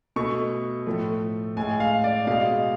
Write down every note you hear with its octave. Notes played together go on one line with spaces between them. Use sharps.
B2 A3 C#6
A2 F3 A3
A2 G#3 G#5
F5
D5
B2 G#3 F5